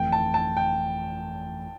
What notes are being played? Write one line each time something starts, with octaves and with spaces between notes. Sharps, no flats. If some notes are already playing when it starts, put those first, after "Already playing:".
Already playing: G1 F2 E3 A3 G5
A5
A5
G5